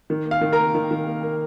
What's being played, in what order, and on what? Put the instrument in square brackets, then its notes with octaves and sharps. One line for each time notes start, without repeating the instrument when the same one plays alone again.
[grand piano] D#3
A#3
F5
D#3
A#4 A#5
A#3
D#3
D#3
A#3
A#3